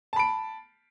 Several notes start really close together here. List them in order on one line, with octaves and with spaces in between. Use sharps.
A5 B5 D7